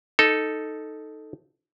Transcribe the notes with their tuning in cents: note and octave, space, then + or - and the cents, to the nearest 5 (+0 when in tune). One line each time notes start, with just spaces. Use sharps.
D#4 +0 A4 +0